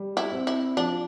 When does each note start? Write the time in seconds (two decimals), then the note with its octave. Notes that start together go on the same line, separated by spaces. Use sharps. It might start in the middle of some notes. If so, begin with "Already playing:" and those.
Already playing: G3
0.17 E4
0.32 C4
0.47 E4
0.76 F3 D4